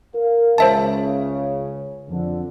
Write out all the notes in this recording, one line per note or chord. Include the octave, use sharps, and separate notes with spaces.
A#4 F5
C#2 C#3 C5 E5 A5
F2 D3